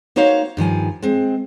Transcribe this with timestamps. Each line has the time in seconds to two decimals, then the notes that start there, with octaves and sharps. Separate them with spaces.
0.16 A#3 D#4 F#4 C5 C#5 F5
0.57 G2 D#3 F3 G#5
1.02 G#3 C4